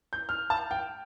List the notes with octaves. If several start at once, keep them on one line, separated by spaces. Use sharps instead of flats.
G6
F6
A5
G5